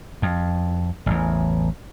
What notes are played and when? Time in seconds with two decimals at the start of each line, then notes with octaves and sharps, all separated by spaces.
0.22 F2
1.06 A1 E2